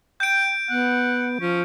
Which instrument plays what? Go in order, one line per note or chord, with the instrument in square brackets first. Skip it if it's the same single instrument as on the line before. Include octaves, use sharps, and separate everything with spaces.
[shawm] G5 [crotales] G6 D7
[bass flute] B3 [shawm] F#5
[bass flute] F3 [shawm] C#4